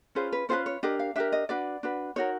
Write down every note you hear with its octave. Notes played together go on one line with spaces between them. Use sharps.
C#4 F4 G#4 B4 C5
B4
C#4 F4 G#4 B4 C5
C#5
D4 G4 A#4 D#5
F5
D4 G4 A#4 E5
D#5
D4 F#4 B4 D5
D4 F#4 B4
D#4 F#4 A#4 C#5